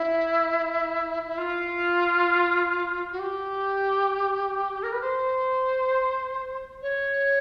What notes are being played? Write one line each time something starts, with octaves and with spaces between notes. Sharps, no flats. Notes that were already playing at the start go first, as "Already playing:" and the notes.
Already playing: E4
E4
F4
F#4
G4
A#4
B4
C5
C#5